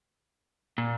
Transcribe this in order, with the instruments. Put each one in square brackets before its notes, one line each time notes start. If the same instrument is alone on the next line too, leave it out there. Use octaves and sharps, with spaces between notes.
[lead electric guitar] A#2